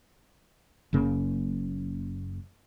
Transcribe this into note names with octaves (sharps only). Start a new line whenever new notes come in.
F#1 F#2 C#3 A#3